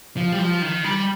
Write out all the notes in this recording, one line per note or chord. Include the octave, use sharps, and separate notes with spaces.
F3
G3
F3
D#3
G3